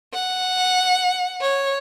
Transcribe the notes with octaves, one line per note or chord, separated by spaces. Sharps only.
F#5
C#5